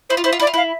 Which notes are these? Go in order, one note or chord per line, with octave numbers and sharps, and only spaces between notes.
E4 C5
F4
E4 C5
F4
E4 D5
F4
E4 F5